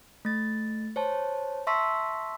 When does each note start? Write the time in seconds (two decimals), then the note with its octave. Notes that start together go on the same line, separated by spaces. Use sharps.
0.25 A3 A6
0.96 C5 C#5 A5
1.67 E5 A5 C6 C#6 E6 B6